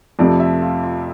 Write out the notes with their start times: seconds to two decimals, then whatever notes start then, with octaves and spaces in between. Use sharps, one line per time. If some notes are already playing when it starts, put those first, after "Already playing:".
0.19 F2 C3 F3 A3 D5
0.40 E5
0.61 F4
0.83 F4